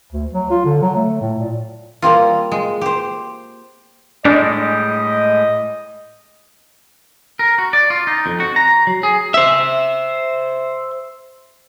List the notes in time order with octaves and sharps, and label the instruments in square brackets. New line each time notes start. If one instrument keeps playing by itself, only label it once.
[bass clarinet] D2
F#3
F4
D3
F#3
A3
A2
A#2
[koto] G3 A#3 C4 F4
G#3
G4 C5
[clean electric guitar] A2 G3 G#3 [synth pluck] D4 [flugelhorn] D#5
[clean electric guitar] A#4
F#4
D5
F4
D#4
F2
F#4
A#5
F#3
G#4
[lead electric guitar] C5 E5